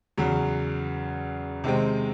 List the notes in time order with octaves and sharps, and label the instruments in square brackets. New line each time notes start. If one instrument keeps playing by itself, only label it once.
[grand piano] E2 C#3 F#3
C3 D#3 G#3 C4